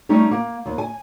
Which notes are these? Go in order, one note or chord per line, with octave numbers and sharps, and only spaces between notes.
G3 A3 C#4 D#4
A#3
D#2
G#5